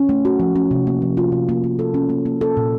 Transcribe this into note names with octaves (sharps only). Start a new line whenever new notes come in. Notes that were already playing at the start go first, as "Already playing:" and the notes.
Already playing: C#4
A3
F#4
F3
C#4
C3
A#3
F3
F4
C3
A#3
A#3
A4
C#4
A#3
A#3
A4
A#2